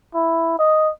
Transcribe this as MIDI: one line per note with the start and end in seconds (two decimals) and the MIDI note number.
0.15 0.56 64
0.59 0.90 75